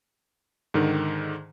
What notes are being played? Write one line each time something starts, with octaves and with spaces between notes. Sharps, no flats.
G#2 D3 D#3